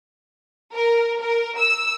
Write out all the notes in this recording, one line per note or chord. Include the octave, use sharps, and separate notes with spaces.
A#4
A#4
E6